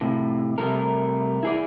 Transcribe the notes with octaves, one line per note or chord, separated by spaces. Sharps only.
A2 C3
C3 G3 A3 A#4
E4 G#4 D5